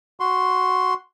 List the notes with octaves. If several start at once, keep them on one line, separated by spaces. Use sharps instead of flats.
F#4 C6